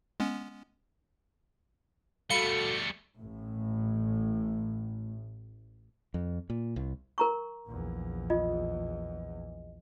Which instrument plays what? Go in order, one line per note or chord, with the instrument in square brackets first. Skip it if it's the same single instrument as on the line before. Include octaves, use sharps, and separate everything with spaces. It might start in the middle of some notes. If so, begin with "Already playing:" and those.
[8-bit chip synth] G#3 B3 C#4
[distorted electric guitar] G3 A3 [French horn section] F#4 A4 [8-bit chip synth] F5 B5 [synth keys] C#7
[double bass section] A1 A2
[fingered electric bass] F2
A#2
C2
[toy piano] A#4 A#5 C#6
[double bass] A#1 E2
[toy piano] F4 [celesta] D#5